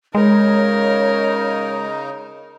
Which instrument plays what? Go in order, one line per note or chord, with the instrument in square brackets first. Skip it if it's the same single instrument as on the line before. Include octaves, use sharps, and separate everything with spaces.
[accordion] C#3 D#4 [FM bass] G#3 [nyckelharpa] A#4 [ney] C#5